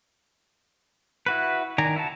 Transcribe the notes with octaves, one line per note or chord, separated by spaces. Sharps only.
E4 F#4 B4
D#3 D5 G#5 A#5
E4 F#4 A5